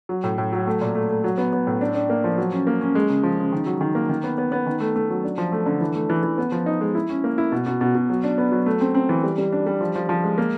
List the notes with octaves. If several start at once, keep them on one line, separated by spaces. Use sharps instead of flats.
F#3
A2
A2
F#3
A3
A#2
A3
A3
F#3
B3
B3
A2
D4
D4
A#3
F3
F#3
C#4
A#3
C#4
G#3
C#3
F3
C#3
D#3
F#3
D#3
A#3
D#3
B3
B3
B3
D#3
A3
A3
F#3
D4
F3
A3
D3
E3
A3
E3
E3
B3
F3
D#4
G#3
E4
C#4
A#3
E4
B2
B2
B2
B2
F#3
D4
B3
F#3
A3
C4
C4
E3
G3
G3
D4
G3
F3
F3
F3
G#3
A#3